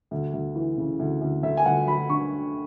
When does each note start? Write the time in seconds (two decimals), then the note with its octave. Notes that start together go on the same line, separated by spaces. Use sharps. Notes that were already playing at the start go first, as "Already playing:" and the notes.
0.11 D2
0.33 D2
0.56 E3
0.78 C#3
0.99 D2
1.21 D2
1.43 D2 E5
1.57 G#5
1.66 D2 F#5
1.87 F#3 B5
2.09 D3 C#6